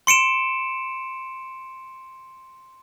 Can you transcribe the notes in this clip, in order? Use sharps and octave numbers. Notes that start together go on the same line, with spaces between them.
C6 C#7 D7 E7